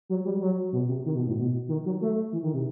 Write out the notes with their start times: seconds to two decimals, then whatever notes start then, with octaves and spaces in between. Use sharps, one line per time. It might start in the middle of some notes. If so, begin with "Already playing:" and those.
0.09 F#3
0.25 G3
0.40 F#3
0.73 B2
0.89 C3
1.05 D#3
1.15 B2
1.27 A2
1.37 B2
1.68 D#3
1.85 F#3
2.01 A3
2.33 E3
2.43 D#3
2.53 C3